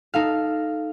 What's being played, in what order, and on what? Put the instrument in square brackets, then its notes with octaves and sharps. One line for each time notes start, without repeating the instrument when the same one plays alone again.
[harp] D#4 A4 F5